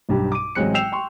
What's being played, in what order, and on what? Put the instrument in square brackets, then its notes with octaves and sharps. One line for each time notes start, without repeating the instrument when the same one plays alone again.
[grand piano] B1 G2 G4
D6 D#7
A1 F#3 G#3 C4 F#6 C#7
G5 E6 G6 C7 E7 F7
G5 C6 C#6